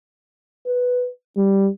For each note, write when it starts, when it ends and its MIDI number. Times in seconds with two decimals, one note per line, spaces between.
0.66 1.09 71
1.37 1.68 55